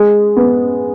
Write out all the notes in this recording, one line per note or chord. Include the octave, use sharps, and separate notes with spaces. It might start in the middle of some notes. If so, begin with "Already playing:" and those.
Already playing: G#3
B3